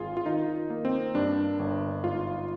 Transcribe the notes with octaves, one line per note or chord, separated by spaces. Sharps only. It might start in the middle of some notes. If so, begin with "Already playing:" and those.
Already playing: G#1 F4 G#4
F4
D#3 D#4
A#3
C4
G2 D4
G1
G#2 F4